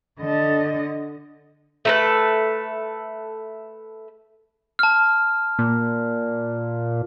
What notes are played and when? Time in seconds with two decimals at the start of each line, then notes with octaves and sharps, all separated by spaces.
0.20 D3 D#5
1.85 A3 A4 B4
4.79 A5 F6
5.59 A#2